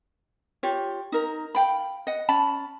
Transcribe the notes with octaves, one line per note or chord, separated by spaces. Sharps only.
F4 G4 C#5
D#4 A#4
F5 G5 B5
D#5 F#5
C#4 A5 B5